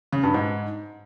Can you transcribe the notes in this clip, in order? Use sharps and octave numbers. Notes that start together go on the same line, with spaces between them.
C#3
G2
G#2